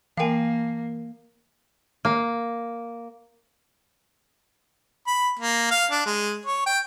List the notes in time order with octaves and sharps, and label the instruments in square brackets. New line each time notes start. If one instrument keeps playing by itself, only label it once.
[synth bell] E3 A#4 [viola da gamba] A#3 [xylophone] F5 G5 G#5
[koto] A#3
[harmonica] B5
A#3
F5
D4
G#3
C#5
G5